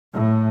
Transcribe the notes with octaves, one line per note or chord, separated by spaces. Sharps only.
A2